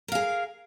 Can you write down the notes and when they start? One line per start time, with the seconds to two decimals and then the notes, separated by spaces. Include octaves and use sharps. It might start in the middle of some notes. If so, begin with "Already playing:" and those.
0.08 A#4
0.12 F5
0.15 G#4